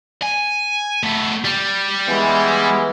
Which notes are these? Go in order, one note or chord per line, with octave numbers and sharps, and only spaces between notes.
G#5
A3 B3
G3
E3 G#3 B3